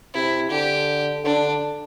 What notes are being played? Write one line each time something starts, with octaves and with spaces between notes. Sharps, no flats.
C3 E4
D3 G4
D3 D4